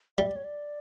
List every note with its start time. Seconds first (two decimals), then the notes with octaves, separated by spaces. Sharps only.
0.18 G3 E5
0.27 D5
0.36 C#5
0.44 D5